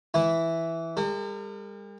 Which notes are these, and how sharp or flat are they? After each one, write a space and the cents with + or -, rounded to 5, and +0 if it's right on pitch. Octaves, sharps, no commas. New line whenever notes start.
E3 +0 E4 +0
G3 +45 A#4 -45